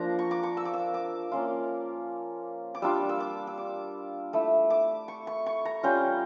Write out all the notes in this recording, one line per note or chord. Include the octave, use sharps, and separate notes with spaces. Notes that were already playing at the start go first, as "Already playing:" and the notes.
Already playing: F3 A#3 D4 A#5
C#6
D6
C#6
E6
D6
E6
D6
A#3 C#4 F4
D6
G3 D4 F4 E6
E6
D6
E6
D6
A3 E4 E6
D6
C#6
C#6
C#6
A#5
G3 C#4 F4 G5